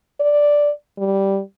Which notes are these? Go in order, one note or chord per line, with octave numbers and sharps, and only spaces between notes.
D5
G3